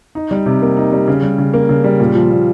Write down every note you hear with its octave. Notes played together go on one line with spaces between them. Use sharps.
D#4
G3
C3
A#3
D#4
G3
C#3
G3
C#3
A#3
C#3
G3
A#2
F3
A#2